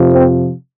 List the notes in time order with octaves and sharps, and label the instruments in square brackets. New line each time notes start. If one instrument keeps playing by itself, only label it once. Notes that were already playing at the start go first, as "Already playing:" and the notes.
Already playing: [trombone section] F2 C3 F3
C4